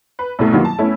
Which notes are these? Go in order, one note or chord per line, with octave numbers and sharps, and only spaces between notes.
B4
C2 B2 A3
D#3 F#3 G3 A#3 B3 F4
A5
A3 B3 C#4 E4